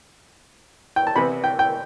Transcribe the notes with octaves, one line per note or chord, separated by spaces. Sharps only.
G5
A5
C3 E3 B3 B5
G5
G5